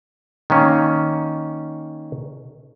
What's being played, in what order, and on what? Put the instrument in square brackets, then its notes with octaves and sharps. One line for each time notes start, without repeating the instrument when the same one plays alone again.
[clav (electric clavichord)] D#3 A#3 C#4